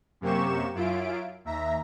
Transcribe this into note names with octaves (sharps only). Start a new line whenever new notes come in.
F#2 C3 A#3 G4 C#6 E7
F#2 E4 F4 D7
D#2 E5 A#5